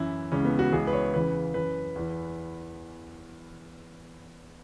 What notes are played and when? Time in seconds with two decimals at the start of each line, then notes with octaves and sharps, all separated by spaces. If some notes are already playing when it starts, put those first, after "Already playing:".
Already playing: F#2 E3 E4
0.31 C#2 C#3 E3 C#4
0.45 B3
0.59 F#4
0.72 C#2 C#3 E3 G#4
0.87 B4
0.93 C#5
1.13 E2 C#3 E3 B4
1.54 F#2 E3 B4
1.96 E2 E3